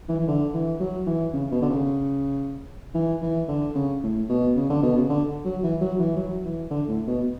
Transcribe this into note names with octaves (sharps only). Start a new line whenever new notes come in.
E3
E3
D3
E3
F#3
E3
C#3
B2
D3
C#3
E3
E3
D3
C#3
A2
B2
C#3
D3
B2
C#3
D3
F#3
E3
F#3
E3
F#3
E3
D3
A2
B2